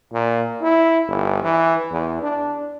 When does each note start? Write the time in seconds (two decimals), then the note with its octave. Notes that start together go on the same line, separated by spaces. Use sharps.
0.13 A#2
0.62 E4
1.07 G1
1.43 E3
1.91 E2
2.23 D4